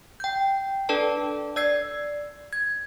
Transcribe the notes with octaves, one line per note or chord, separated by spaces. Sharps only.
G5 G6
D4 A4 B4 D5 A5
D5 E6 G#6 C7
G#6